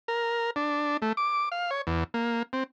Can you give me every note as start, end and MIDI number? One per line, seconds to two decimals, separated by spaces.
0.08 0.50 70
0.56 0.97 62
1.02 1.13 57
1.17 1.49 86
1.52 1.70 77
1.71 1.82 73
1.87 2.04 40
2.14 2.43 58
2.53 2.64 60